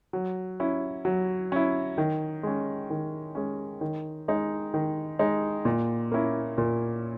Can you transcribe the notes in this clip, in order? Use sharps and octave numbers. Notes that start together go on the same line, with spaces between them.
F#3
C#4 E4
F#3
C#4 E4
D#3
G#3 C#4
D#3
G#3 C#4
D#3
G#3 D#4
D#3
G#3 D#4
A#2
A#3 C#4 E4
A#2